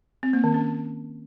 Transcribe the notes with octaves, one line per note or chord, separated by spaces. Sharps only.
C4
A#3
D#3
C#4